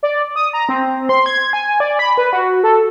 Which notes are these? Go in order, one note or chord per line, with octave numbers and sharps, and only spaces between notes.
D5
D#6
A#5
C4
C6
G#6
G#5
D5
B5
B4
F#4
A4